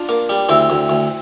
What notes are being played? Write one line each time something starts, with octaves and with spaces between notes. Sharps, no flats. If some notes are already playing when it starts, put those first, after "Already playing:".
Already playing: D4 F4
A#3
G3
D2 C4 E4
D2
D2